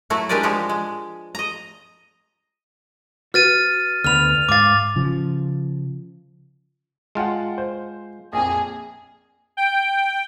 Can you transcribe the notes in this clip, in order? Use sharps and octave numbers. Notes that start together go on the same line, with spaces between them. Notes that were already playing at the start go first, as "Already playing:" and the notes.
F#3 A3 E4 F#4
G#3 D4 G4 A#4 B4 D5
F3 G#3 F#4 G4
G#3
D#5 A#5
F#4 B4 F6 A6 D#7
D2 B3 B5 F6 F7
G#2 F5 D6 A6
C#3 F3
G#3 F4 F#5 G5 A5
C5
A#1 F2 G#4
G5